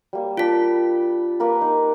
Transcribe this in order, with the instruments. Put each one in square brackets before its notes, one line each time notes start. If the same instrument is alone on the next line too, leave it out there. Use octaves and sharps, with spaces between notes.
[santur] G3 A#3
[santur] D4 B4 [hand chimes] F4 B6
[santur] A#3 A#4 B4
D#4